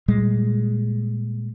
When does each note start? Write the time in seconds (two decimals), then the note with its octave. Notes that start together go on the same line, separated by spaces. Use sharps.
0.08 A#2 G3 G#3